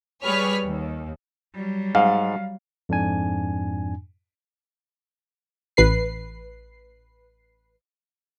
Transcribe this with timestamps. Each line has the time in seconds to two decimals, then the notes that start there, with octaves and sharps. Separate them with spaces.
0.23 G3 G#4 B4 C#5 F6 B6
0.65 D#2
1.54 F#3 G3
1.95 G#2 F5
2.89 F2 G#2 D4 G#5
5.77 A1 B4 C7